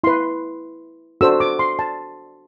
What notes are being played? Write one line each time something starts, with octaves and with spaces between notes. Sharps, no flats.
E4 B4 C6
D4 F#4 A4 C5 E6
D6
C6
A5